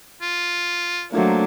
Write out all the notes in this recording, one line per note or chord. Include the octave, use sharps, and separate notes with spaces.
F4
F#3 A3 A#3 D4 C5